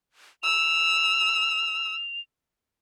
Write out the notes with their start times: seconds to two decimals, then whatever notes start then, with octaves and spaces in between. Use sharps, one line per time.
0.43 E6 F7